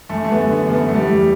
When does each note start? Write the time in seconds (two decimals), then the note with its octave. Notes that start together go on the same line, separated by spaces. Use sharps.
0.09 F#2 A3
0.24 A3
0.31 B3
0.38 D3
0.53 B3
0.67 F#2 B3
0.74 A3
0.89 A3
0.96 E2 G3